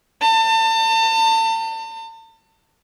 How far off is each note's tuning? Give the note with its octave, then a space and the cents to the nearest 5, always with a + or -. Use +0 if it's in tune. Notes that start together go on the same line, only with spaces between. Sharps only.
A5 +35